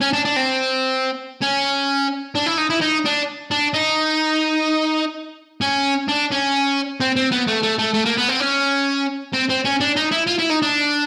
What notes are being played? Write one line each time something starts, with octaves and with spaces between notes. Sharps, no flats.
C#4
D4
D4
C4
C#4
D4
E4
D#4
E4
D#4
D4
D4
D#4
C#4
D4
C#4
C4
C4
B3
A3
A3
A3
A3
A#3
B3
C4
C#4
C4
C4
C#4
D4
D#4
E4
F4
E4
D#4
D4